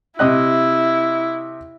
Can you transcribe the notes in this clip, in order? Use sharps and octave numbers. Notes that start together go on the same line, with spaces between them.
C3 E4 D#5 F#6